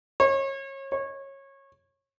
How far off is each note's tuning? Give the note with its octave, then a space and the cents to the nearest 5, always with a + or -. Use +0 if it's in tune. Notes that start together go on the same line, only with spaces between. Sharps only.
C#5 -30
C#5 -20